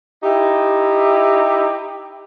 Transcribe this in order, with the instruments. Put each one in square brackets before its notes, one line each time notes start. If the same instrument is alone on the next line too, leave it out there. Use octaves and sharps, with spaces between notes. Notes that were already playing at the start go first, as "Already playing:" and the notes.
[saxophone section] D#4 E4 G4